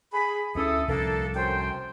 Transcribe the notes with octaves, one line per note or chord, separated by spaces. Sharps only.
G#4 B5
D2 C#4 E4 A4 D#6
C2 F3 A#3 D4 A4
F#2 C5 G5